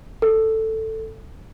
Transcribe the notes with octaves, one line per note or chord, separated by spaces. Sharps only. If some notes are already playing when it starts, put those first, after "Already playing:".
A4